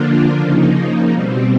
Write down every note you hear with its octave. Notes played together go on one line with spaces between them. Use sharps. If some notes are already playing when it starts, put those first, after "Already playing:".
Already playing: D3 F3 A#3 D4 F4
C#3 F3 A#3 D#4
B2 G3 C4